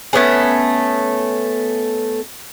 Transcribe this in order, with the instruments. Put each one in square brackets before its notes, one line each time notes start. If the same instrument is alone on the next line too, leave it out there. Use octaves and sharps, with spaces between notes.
[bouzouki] A3 B3 C#4 G#4